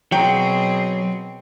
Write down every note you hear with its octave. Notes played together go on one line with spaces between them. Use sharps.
B2 F#3 C4 G#4 G5 A#5